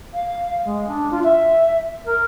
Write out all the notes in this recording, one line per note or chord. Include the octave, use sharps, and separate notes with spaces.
F5
G#3
D4
F4
E5
A#4